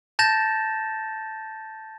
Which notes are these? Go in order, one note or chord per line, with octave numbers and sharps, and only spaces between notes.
A5 G6 A6 A#6 E7